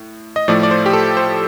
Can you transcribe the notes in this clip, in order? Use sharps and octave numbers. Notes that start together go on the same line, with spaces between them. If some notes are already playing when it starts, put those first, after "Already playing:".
Already playing: A2
D#5
A2 F3 A3 D5
D5
C5
G4
A4
C5